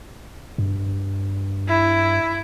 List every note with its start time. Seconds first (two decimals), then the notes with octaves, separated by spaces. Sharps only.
0.58 G2
1.69 E4